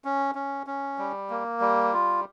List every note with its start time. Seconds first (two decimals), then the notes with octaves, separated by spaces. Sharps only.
0.05 C#4
0.35 C#4
0.67 C#4
0.98 G3
1.30 A#3
1.60 G3
1.93 F4